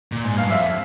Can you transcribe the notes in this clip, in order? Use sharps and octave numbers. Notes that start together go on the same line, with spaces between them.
A#2
G#2
G2 F5
F2 E5